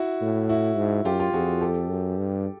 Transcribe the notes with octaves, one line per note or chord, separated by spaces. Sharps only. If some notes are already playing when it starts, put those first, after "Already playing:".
Already playing: E4 F#4
A2
E4 F#4
G#2
F#2 F4 G4
F4 G4
F2 F#4 G#4
G4 A4
F#2
G2